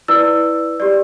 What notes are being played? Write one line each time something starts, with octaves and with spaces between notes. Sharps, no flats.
E4 B4 D5 E6
G4 D5